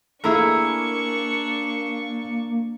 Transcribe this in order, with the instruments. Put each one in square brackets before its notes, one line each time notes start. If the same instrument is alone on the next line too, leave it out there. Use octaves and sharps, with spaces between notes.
[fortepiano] A3 E4 E6 [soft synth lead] A#3 [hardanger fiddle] D4 C#6 [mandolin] G#4 A#4